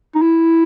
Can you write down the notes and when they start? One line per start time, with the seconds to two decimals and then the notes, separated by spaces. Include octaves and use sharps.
0.15 D#4
0.22 E4